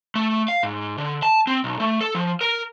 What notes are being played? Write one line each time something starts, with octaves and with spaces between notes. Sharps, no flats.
A3
F5
G#2
D3
A5
C4
B1
A3
A4
F3
A#4